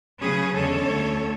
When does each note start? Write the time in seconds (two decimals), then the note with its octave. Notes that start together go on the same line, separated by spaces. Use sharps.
0.21 C#3 F#3 C#4 G#4 B4
0.55 E2 D3 G#3 C#4 A4 C#5
0.90 D2 D3 A3 C#4